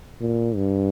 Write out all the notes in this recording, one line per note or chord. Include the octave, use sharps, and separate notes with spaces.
A#2
G2